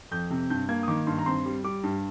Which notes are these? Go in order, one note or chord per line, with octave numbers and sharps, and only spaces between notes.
F2 G6
C3
G2 G6
A#3 G#6
D#6
D#3 D6
G2 C6
A#5
C4 C6
G3
G3 D6
G2